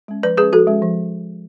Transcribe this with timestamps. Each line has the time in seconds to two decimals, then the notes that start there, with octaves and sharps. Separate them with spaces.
0.08 G#3 C#4
0.23 F3 B4 D5
0.37 G#3 G#4 B4
0.42 C#4
0.53 F3 F#4 A4
0.67 G#3 C#4
0.82 F3